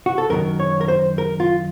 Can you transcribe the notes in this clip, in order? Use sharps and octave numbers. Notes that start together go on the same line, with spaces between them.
F#4
A4
F#2 D#3 F#3 A#4
C#5
A#4
C5
A#4
F4